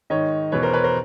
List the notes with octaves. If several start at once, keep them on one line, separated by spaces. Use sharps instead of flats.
G#2 D#3 C#5 D#5
E2 B2 B4 C#5
A#4 C5
B4 C#5
A#4 C5